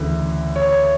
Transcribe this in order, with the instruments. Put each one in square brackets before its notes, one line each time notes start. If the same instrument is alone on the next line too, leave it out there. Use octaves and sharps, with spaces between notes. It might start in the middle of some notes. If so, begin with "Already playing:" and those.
Already playing: [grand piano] D2 C#3 E3
C#5